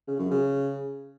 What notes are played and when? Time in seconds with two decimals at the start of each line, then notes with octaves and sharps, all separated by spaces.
0.08 C#3
0.19 F#2
0.31 C#3